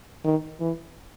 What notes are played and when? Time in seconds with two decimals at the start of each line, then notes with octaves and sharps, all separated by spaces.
0.24 D#3
0.60 E3